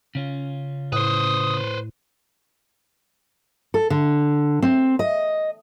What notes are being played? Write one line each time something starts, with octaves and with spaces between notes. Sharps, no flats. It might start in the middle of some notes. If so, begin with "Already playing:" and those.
C#3 C#4 F4
A2 B4 C5 D#6
A4
D3
C4
D#5